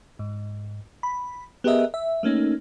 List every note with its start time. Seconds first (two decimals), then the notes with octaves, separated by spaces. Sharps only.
0.19 G#2
1.03 B5
1.64 B3 G4 G#4 A#4 D#5 E5
1.94 E5
2.23 A3 A#3 C#4 D#4